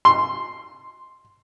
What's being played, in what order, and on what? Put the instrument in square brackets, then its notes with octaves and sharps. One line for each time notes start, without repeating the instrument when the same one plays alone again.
[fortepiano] C6